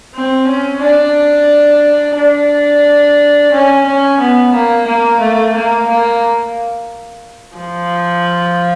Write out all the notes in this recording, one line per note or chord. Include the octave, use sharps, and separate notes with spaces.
C4
C#4
D4
D4
C#4
C#4
B3
A#3
A#3
A3
A#3
A#3
F3